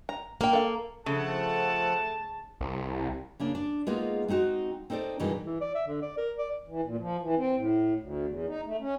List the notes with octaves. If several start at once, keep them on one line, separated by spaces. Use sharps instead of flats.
A#5
A#3 A#4 G5
A4 F5
C#3 F3 A3 A4 F#5 A5
C2
C#3 A#3 D4
D4 D5
G#3 A#3 B3 D#4 F4 G#4
G#3 C4 D#4 F#4
C4 D#4 A4 C5 D5
G2 B2 D#3 E3 G#3 D#4
E3
D5
E5
D3
D5
A#4
D5
E3
A#2
F3
E3
C4
A2
D2
E2
D#4
A3
C#4